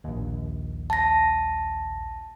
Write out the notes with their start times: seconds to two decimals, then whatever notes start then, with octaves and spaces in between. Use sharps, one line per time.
0.04 A#1 D#2
0.90 A5 A#6